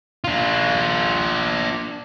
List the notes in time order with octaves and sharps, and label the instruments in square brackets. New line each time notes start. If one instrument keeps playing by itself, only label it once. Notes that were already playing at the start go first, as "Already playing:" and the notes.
[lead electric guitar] D4 F4